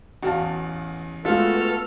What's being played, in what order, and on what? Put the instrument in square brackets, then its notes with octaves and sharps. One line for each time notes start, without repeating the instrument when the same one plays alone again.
[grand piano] A1 E2 [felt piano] F#4 F5 A5
[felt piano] G#3 F4 F5 [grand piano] A3 F#4 [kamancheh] B3 F6 [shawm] A4